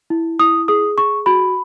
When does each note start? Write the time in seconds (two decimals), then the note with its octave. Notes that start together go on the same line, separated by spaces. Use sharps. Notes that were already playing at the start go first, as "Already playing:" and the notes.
0.10 E4
0.39 E4 D#6
0.68 G#4 D#6
0.98 G#4 C#6
1.26 F#4 B5